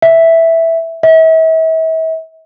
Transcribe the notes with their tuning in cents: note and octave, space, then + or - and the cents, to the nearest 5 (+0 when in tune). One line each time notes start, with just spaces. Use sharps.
E5 -5
E5 -40